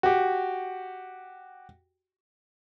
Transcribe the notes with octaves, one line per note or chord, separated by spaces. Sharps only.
F#4 G4